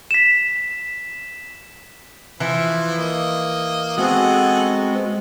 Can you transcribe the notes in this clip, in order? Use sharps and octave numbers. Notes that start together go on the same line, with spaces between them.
B6 E7
E3 F3 E4
A#3 D#5
G#3 B3 C4 F#4 G#4 A4 F#5